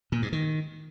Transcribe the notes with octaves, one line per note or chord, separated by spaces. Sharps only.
A#2
G2
D#3